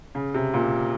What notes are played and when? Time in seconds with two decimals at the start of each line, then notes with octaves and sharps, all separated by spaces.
0.15 C#3
0.34 C3
0.54 A#2